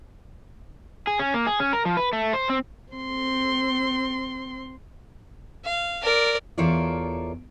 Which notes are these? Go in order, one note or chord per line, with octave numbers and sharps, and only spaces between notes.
G#4
C#4
A#3
G#4
C#4
A#4
F3
B4
A3
C5
C4
C4 C6
F5
A#4 D5
E2 F4 A4 A#4 C#5 D5